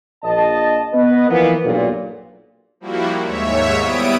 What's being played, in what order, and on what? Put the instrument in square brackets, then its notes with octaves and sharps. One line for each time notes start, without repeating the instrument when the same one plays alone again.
[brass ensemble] A#1 D#5 A5
B3 B4 D#5
E3 F3 A#3 B3
B1 G2 A#2
[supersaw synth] F3 G3 A#3 E4 F#4
D#2 G#2 C#5 E5
G3 B3 E4 D#6 D7